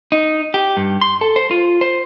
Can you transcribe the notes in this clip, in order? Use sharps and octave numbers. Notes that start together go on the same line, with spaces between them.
D#4
G4
G2
C6
A4
C5
F4
C5